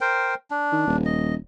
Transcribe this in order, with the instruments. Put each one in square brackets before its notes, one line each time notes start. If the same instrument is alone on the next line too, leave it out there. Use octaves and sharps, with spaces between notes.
[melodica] A#4 C5 G5
D4
[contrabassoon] D#3
D#1
[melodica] D#5